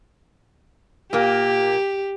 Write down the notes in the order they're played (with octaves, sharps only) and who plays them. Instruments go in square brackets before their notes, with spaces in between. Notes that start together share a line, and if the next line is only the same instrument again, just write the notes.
[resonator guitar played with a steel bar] A#2 A#3 [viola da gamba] G4